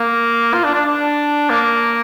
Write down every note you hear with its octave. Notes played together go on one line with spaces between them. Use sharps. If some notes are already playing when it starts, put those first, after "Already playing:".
Already playing: A#3
F4
D4
D4
D4
A#3